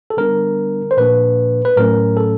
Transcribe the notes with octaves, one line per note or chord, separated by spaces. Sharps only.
A4
D3 G3 B3 D4 A#4
C5
A#2 F3 A#3 D4 B4
B4
A2 F#3 A3 C#4 A#4
A4